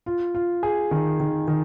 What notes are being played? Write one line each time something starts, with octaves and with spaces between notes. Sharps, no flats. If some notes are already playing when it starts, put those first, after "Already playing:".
F4
F4
G#4
D#3
D#3
D#3